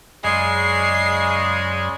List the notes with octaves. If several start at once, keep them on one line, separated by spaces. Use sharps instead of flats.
F#2 C#3 G#3 D5 G#6 C7